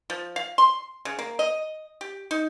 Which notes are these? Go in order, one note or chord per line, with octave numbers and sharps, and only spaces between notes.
F3
F5
C6
C#3
A#3
D#5
G4
D#4